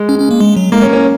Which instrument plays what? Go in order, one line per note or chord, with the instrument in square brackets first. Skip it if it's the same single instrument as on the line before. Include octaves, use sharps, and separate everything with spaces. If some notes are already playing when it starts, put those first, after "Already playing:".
Already playing: [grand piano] G#3
[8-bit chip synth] C#4
C#4
A#3
G#3
F#3
[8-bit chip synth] G#3 [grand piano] A#3
[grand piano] C#4
C#4